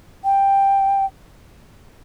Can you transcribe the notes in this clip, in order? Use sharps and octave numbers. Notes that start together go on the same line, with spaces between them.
G5